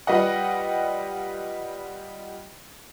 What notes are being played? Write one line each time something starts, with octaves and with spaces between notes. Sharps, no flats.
G3 F4 B4 D#5 F#5